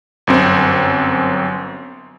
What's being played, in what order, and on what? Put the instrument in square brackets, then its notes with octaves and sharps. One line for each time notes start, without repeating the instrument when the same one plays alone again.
[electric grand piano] G1 F#2 C4